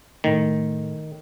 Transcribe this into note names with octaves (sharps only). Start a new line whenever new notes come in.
A2 D#3 A3